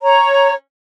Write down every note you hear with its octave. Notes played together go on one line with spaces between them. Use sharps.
C#5 A#5